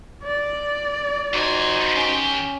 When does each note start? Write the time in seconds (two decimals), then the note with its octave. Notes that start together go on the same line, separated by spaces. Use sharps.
0.23 D5
1.34 F2 D#4 F#4 C5 G#5
1.96 D#3 C#4 G4